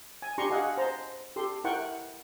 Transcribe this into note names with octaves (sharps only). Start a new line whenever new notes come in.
G#5
D4 G4 A#5 C6 C#6
F#4 G#4 D#5 F5 F#5
C5 A5 A#5
G4 A4 C6
E4 A#4 F#5 G5 C#6